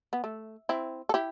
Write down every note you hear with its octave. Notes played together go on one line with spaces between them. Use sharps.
B3
A3
C4 E4
A4
E4 G4